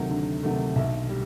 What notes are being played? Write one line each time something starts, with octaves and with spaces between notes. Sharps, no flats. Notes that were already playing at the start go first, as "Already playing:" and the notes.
Already playing: D2 C3 D#3 F#3 A3
D2
C3 D#3 F#3 A3
B1 E5
G3